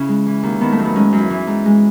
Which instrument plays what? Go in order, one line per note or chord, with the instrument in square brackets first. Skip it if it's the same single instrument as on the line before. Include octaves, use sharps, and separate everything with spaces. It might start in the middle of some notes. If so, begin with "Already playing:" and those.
Already playing: [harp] C#3 C#4 E4
G#3
E3
D#2
D#3 B3
A3
F#2
B3
G#3 C#4
F#2
E4
E3
G#2
G#3